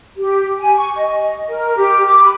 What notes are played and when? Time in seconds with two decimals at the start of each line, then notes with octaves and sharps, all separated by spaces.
0.17 G4
0.58 G#5
0.77 C#6
0.96 D#5
1.47 A#4
1.76 G4
2.07 D6
2.22 B5